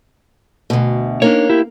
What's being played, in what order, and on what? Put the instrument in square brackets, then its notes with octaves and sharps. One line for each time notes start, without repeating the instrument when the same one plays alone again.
[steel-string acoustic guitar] D2 B2
[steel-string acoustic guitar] A#3 [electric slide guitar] D4 D#4 C#5
[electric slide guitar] E4 G4